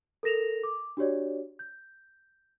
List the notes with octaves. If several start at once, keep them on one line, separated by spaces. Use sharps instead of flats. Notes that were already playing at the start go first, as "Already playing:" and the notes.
A4 A#4 A#6 E7 F7
D6
D4 F#4 G4 C#5 D5
G6